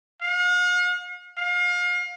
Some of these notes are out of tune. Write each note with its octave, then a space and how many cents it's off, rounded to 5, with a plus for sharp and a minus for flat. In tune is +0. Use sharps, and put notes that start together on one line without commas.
F5 +45
F5 +35